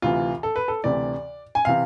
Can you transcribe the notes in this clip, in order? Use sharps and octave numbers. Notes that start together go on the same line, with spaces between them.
D2 C3 E3 F4
A4
B4
A4
D2 C3 E3 D5
G#5
C3 E3 F5